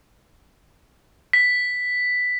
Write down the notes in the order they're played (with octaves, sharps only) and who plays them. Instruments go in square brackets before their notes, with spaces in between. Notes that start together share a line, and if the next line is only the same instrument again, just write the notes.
[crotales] B6